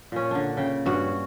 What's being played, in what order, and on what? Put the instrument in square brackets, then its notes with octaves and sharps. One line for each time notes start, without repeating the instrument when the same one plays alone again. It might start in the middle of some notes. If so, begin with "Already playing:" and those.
[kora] A#2 C#4
D3 D4
C#3 G5
G2 C#4 F#4